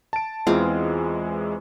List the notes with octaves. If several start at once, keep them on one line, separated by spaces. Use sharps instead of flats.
A5 D7
E2 E3 G#3 C4 F4